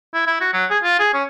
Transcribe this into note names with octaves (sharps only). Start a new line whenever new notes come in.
E4
E4
F#4
F#3
G#4
F4
G#4
C#4